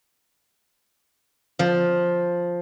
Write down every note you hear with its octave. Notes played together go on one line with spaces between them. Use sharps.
F3